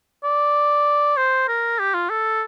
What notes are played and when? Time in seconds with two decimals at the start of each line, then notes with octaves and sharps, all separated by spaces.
0.24 D5
1.17 C5
1.48 A#4
1.79 G4
1.94 F4
2.10 A4